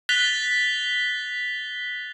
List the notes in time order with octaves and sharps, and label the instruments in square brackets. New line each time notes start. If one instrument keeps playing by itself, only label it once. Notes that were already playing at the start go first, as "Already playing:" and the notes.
[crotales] F#6 A6 B6 F7 G7